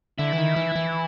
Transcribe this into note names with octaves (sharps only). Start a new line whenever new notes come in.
D3 E4
E3
D#3
E3
E3